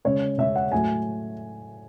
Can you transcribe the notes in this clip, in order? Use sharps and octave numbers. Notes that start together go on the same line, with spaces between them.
C#3 G#3 C#4 C#5
C#3 G#3 C#4 E5
F#5
A2 F#3 A3 G#5